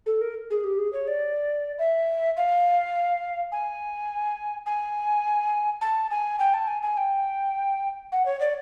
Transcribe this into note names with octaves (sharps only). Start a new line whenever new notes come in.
A4
A#4
G#4
G4
G#4
C#5
D5
E5
F5
G#5
G#5
A5
G#5
G5
A5
G#5
G#5
G5
F#5
C#5
D5